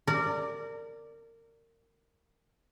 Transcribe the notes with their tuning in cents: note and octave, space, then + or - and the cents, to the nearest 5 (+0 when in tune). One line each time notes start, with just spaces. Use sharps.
A#4 -25 D5 +0